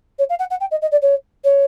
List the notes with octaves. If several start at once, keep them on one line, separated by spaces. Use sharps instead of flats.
C#5
F5
F#5
F#5
G5
D#5
D#5
D5
C#5
C#5